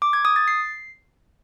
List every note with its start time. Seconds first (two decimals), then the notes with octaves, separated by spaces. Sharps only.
0.02 D6
0.13 G#6
0.25 D#6
0.36 A6
0.48 C7